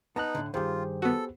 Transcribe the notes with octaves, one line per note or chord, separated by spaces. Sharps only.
B3 D#4 A5 A#5 F#6
A2 D3
G2 D#3 F4 G4 G#4 C5
B3 F#4 A4